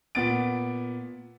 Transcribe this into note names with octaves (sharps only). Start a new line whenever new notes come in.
A#2 B3 A6 D7